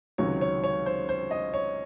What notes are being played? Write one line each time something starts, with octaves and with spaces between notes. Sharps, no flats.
C#2 C3 D#3 F#3 C#5
C#5
C#5
C5
C5
D#5
C#5